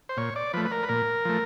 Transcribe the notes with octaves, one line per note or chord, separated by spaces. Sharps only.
C5
A#2 C#5
D5
F3 A3 B4
B4
A#4
B4
A#2 A#4
F3 A3